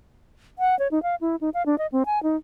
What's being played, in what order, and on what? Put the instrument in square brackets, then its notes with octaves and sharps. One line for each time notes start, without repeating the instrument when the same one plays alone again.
[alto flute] F#5
C#5
D#4
F5
E4
D#4
F5
D4
D#5
C4
G#5
D#4